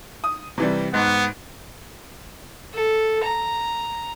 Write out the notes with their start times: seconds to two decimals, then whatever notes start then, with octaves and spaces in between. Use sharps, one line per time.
0.24 D#6
0.58 C3 E3 G3
0.94 G#2 B3
2.74 A4
3.24 A#5